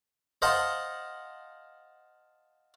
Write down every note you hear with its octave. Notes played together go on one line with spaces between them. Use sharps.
C5 D#5 F5 F#5 A5 C6